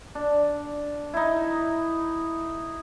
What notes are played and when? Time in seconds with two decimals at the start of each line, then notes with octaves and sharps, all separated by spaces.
0.15 D4
1.14 D#4 E4